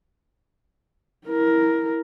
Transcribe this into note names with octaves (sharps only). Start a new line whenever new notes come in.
E4 A#4